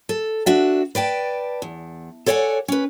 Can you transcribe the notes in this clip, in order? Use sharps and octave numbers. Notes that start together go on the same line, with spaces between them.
A4
D4 F#4 E5
B4 D5 G5 A5
E2
A4 C#5 D5 E5 F#5 G#5
C#4 B4